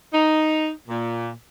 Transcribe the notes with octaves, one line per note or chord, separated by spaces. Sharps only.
D#4
A#2